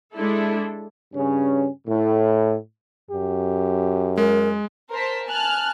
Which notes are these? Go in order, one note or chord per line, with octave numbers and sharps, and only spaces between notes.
G#3 D4 E4 A4
G2 C#3 C#4
A2
F#2 G4
G#3 A#4
A#4 C5 A5 B6
G#5 A5 F6 F#6